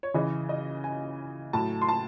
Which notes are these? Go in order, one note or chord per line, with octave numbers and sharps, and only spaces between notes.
C#5
C#3 E3 D#5
D#5
G#5
A2 F#3 A5
C6
A5